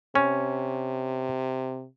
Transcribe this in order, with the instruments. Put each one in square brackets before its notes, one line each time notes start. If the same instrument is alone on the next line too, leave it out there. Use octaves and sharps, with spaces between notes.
[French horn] C3 [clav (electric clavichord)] C#4